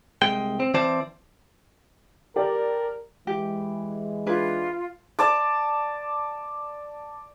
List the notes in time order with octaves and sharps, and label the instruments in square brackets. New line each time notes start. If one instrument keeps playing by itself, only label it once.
[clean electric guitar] C2 G#3 G5
C4
E3 C4 C5 D5 A5
[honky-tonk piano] G4 A4 D5 [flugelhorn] A#4
[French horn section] E3 G#3 [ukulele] G4
[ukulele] D4 G#4 B4 [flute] F4
[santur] D5 A5 D6